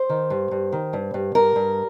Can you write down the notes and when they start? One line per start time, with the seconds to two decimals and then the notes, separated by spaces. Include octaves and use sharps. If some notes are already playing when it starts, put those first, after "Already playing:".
Already playing: C5
0.09 D#3
0.30 G2
0.51 G2
0.72 D#3
0.93 G2
1.14 G2
1.35 G2 A#4
1.56 G2